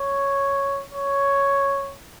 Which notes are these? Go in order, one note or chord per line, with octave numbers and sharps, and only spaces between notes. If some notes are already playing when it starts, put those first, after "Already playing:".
Already playing: C#5
C#5